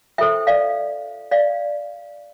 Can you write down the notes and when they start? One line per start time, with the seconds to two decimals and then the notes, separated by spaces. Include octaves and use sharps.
0.18 F4 A4 C5 E5 G5
0.47 D5 F5
1.31 D5 F5